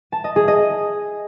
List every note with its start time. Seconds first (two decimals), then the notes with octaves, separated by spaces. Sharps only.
0.12 A5
0.24 D#5
0.36 G#4
0.48 D#5